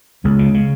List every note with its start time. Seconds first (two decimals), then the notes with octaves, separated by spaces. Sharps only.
0.24 C#2 G#3 B3
0.39 C#3
0.54 C#3